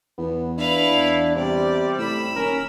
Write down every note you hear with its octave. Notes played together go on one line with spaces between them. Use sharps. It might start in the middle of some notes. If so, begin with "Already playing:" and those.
E2 B3
D4 E4 B4 F5
E2
C3 G3 D5
A2 C3 B5 E6
D#1 C#4 A#4